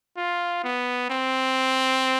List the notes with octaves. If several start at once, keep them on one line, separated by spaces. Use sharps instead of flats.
F4
B3
C4